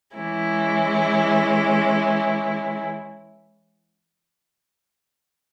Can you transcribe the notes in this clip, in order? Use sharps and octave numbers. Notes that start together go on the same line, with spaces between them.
E3 G#3 C#4 E4